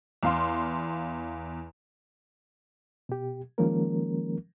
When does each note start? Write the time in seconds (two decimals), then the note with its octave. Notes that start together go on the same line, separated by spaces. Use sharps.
0.23 E2 F5 C6
3.09 B2 G4
3.58 D#3 F3 G#3 A#3 C#4 A#4